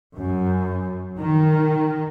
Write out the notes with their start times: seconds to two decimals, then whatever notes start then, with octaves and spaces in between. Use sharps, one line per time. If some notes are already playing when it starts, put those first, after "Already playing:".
0.17 F#2
1.20 D#3